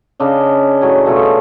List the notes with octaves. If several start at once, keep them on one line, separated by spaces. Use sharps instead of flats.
C#3 D4 D#5
A2 F#3 G#5
B2 A3 F4 G#4